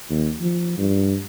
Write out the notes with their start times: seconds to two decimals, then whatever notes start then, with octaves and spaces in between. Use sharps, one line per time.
0.10 D#2
0.41 F3
0.78 G2